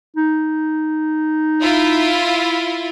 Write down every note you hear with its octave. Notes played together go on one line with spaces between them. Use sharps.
D#4
E4 F4